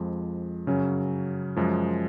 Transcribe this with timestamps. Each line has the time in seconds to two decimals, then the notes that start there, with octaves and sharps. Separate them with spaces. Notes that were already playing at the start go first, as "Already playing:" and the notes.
Already playing: F2 F3 G#3
0.67 F#2 C#3 F#3 C#4
1.56 F#2 F3 G#3